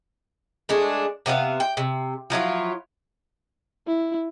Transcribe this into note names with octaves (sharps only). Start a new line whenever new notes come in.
G#3 A3 D4
C3 B3 E5 F5
G5
C3
F3 F#3 E4 F4
E4